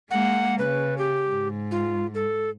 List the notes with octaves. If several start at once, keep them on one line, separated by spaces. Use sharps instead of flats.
G#3 A#3 F#5
C#3 B4
G4
G#2
F4
A4